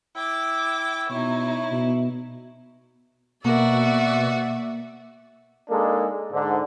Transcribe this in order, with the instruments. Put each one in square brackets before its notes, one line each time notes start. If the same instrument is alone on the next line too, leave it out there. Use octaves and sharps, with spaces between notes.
[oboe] E4 [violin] G5 D6
[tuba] B2 [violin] D#4 E4 [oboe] C#5
[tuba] B2
[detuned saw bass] B2 [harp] A#3 A#4 [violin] F#4 [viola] D5 E5
[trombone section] G#3 A#3 D4 D#4 A4
G#2 D3